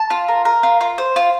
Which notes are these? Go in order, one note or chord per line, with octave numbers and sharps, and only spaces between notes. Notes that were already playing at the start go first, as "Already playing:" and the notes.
Already playing: A5
F4
A#4
A#4
F4
F4
C5
F4